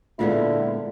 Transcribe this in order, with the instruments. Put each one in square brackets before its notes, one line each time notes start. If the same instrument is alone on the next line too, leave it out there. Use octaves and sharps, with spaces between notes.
[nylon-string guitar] A#2 G#3 B3 [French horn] D3 [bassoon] E4 [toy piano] F4 E5 F5